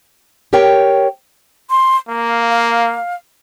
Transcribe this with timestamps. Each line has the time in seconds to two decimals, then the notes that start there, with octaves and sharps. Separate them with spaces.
0.53 G4 A#4 C#5 G5
1.70 C6
2.09 A#3 F5
2.50 F5